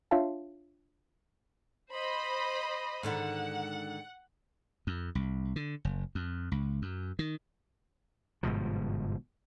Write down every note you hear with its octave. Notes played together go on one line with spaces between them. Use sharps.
D4 F4 C#5 E5 F5 A5
C5 D#5 B5
G#2 D3 D#3 F#5
F2
C2
D3
F#1
F2
C#2
F#2
D#3
G1 G#2 B2 F3